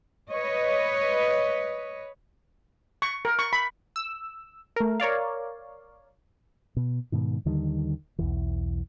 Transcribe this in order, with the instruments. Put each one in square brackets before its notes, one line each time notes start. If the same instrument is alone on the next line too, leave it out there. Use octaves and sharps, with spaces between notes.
[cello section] B4 C#5 D#5
[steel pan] C#6
A#4
C#6
B5
[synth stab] E6
A3 A#4
A#4 C#5 D5 F5
[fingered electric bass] B2
G#2 B2 D#3
D#2 D3 D#3 G3
B1 E2 E3